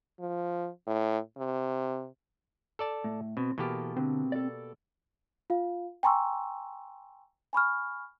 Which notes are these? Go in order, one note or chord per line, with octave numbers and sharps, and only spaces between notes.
F3
A2
C3
A4 D5 A5
A2
B2 C4
B2 E3 A#3 G4 A4 A#4
D3 C4
A4 D5
F4 F5
G5 G#5 A#5 C6 C#6 E6
G#5 B5 C#6 F6